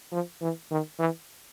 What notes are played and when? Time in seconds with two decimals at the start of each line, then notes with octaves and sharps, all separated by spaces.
0.12 F3
0.41 E3
0.71 D#3
0.99 E3